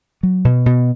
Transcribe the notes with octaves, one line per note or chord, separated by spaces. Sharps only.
F#3
B2
B2